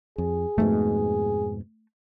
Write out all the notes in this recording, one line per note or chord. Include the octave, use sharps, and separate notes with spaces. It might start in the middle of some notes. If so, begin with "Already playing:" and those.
F2 G#4
F2 G#2 B2 A3